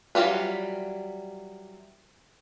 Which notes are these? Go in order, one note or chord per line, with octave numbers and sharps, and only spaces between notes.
E3 F#3 G3 F4 B4